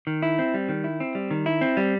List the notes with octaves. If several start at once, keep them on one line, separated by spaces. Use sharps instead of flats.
D#3
E4
C4
G3
D#3
E4
C4
G3
D#3
E4
C4
G3